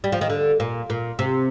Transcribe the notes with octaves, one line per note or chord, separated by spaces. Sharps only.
G3
F3
D#3
D3
A#2
A#2
C3